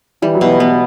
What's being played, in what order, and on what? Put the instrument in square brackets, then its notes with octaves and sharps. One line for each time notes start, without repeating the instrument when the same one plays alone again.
[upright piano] E3 [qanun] G3
[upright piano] F#3
[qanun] B2 [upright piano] E3
[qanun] B3